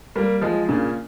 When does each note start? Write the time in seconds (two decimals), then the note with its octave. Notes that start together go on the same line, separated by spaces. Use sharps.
0.16 G3 A#3
0.41 F3 G#3
0.68 A#2 C#3